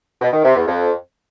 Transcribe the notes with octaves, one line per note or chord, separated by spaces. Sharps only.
B2
D#3
C3
E2
F2